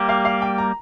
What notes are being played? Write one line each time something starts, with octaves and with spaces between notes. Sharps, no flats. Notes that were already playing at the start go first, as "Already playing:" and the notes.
Already playing: G3 A#3 G4
F5
F5
G5
A#5